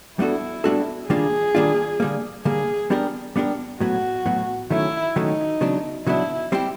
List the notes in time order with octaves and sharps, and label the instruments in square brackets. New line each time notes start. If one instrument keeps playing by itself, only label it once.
[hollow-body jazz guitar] G3 B3 D4 F#4 A4 [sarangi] E4
[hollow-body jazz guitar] G3 B3 D4 F#4 A4
[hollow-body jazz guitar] D#3 G3 A#3 D4 F4 [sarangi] G#4
[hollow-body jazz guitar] D#3 G3 A#3 D4 F4
D3 G3 A#3
[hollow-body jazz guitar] D3 G3 A#3 [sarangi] G#4
[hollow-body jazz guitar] G3 B3 D4 G4 A#4
G3 B3 D4 G4 A#4
[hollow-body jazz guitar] A2 F#3 B3 [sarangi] F#4
[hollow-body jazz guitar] A2 F#3 B3
[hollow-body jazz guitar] D#3 F#3 A3 C#4 [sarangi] E4
[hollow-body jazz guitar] D#3 F#3 A3 C#4 [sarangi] D#4
[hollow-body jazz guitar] C#3 F#3 B3 D4
[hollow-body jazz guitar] C#3 F#3 B3 D4 [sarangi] E4
[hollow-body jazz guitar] G3 C4 E4 G4